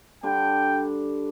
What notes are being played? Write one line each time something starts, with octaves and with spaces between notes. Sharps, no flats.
D3 G3 D4 G5